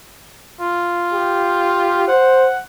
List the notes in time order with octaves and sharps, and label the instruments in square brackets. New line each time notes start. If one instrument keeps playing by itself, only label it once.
[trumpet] F4
[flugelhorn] G4
[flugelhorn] C5 [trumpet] F#5